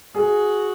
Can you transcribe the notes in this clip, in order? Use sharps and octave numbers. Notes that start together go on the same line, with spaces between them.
F#4 G#4